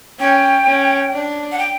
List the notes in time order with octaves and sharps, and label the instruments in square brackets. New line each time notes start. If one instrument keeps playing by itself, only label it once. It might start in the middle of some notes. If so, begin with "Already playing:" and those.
[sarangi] C#4 [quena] G5
[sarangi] C#4
D4
[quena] F#5
G5